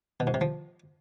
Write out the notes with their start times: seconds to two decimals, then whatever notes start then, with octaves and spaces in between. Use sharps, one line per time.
0.20 B2
0.27 G#2
0.34 C3
0.41 F3